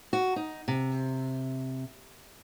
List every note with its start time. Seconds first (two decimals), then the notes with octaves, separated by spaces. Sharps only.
0.13 F#4
0.36 D#4
0.68 C3